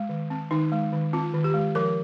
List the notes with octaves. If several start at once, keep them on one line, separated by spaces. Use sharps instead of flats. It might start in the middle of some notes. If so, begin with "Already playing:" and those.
Already playing: G#3
D#3
C4
D#3 D#4
G#3
D#3
C4 F4
D#3
G4
G#3
F3 A#4